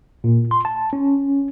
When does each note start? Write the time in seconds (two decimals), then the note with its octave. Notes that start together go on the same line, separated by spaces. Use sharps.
0.24 A#2
0.51 C6
0.65 A5
0.93 C#4